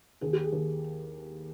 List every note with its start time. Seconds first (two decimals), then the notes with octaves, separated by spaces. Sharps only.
0.21 D#2 G#4
0.33 G4
0.44 G#4
0.53 D#2